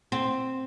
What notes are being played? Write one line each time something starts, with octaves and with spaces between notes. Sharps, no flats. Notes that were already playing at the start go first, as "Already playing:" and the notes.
C4